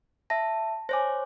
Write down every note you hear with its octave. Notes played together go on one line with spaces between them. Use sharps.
E5 A5 A#6
C5 C#5 G#5 D6 A#6